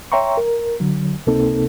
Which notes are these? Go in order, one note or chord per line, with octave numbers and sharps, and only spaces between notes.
C#5 E5 G5 A#5 C6 C#6
A#4
D3 F#3
C#2 C3 A#3 C4 D#4 A4